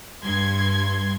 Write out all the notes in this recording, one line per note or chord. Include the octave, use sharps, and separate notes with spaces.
G2 C6 G#6